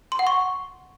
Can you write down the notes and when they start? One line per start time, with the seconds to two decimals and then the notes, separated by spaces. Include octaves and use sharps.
0.12 C6
0.19 F#5
0.27 C#6